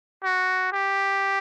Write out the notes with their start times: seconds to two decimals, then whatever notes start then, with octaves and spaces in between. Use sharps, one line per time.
0.24 F#4
0.72 G4